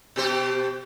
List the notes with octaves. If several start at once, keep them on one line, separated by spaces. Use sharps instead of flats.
B2 G4 C5